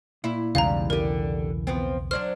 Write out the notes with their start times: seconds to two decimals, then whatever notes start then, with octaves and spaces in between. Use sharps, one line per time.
0.24 A#2 E4
0.55 B1 E2 G#2 C#3 E3 G3 F5 A#5
0.90 D3 G4 A#4
1.67 F3 B3 C4
2.11 F#3 D4 C5 F6